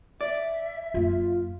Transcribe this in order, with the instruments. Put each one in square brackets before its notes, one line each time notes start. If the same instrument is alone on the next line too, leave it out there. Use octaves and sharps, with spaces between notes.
[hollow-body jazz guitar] D5 [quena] E5
[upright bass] F#2 A#3 [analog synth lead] F4